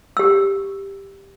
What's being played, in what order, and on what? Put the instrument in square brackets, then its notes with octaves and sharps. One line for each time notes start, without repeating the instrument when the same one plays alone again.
[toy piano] G4 E6